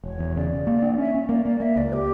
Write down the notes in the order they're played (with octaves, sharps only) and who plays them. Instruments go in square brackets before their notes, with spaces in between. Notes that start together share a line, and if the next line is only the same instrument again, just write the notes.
[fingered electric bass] E1 [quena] C#5
[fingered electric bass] E2
[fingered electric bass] C#3 [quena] D5
[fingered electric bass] C#3
A#3
D4
[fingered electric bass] C#4 [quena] E5
[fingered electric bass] C#4
[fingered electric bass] A#3 [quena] D5
[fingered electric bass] A#3 [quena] D5
[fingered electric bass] A#3 [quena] E5
[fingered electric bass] C#2 [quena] D5
[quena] G4